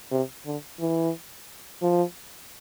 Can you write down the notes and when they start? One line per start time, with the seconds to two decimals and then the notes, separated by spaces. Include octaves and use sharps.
0.11 C3
0.46 D3
0.79 E3
1.82 F3